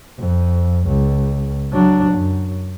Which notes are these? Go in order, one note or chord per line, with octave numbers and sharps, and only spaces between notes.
F2
C#2
F#3 D4
F#2